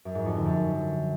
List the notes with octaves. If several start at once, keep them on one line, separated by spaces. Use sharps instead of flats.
F#2
G#2
F2
D3
F#2